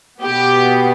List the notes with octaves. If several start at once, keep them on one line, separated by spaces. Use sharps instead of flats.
B2 B3 G4